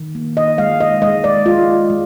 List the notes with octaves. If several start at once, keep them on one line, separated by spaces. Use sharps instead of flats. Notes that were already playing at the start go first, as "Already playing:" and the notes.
Already playing: D#3
A#3
D#5
G#3 F5
D#5
G#3 D#5
D5
G#3 F4
G#3